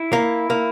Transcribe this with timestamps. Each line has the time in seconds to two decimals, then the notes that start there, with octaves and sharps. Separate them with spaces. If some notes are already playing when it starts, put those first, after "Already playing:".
Already playing: E4
0.13 A#3
0.50 A#3